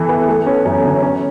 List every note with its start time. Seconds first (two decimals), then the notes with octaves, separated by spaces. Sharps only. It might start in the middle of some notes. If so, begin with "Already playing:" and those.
Already playing: E3 E4 A4
0.09 B3
0.28 A3
0.47 C#4
0.65 F#2
0.84 D3
1.02 C#4